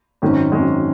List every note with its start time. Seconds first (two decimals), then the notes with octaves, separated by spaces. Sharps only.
0.22 G#1 F#2 D#3 G#3 C#4
0.52 G#1 F#2 D#3 G#3 C#4